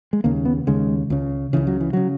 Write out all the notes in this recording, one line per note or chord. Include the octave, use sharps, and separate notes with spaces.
G#3
D#2 C#3 A#3
B3
D#2 C#3 G#3
C#2 C#3
C#2 C#3 E3
F#3
E3
C#3 F#3